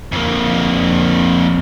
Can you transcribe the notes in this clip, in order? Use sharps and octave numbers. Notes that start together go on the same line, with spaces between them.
F2 A#3